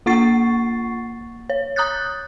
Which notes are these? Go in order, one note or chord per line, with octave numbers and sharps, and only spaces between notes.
A#3 F4 F#5 C#6 A6 C7
C#5
A#5 D#6 F#6 G6 A6